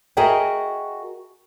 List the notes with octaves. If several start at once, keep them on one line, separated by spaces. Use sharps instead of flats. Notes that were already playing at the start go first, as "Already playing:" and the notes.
F#4 G#4 A#4 D#5 E5 G5